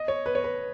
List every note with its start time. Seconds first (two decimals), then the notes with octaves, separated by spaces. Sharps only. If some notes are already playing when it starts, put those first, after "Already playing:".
Already playing: D#5
0.08 C#5
0.26 B4
0.35 C#5
0.44 B4